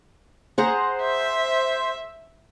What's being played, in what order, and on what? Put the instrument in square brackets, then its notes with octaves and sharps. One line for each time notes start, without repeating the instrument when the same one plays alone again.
[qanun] G#4 F#5 A#5 [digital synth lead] C5
[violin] E5